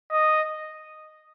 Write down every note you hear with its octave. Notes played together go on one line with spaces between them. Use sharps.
D#5